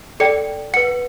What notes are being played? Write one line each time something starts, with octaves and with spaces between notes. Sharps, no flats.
A4 D5 G5 C#7
B4 F#5 C#7